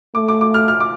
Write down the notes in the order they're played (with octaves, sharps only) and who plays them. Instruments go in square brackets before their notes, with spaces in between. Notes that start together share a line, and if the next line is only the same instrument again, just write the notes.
[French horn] A3 [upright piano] D6
[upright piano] D6
D6
F6
F6
D6